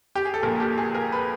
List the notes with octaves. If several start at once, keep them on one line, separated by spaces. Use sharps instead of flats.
G4
G#4
A4
A#1 A#2 F3 A#4
G4
G#4
A#4
B4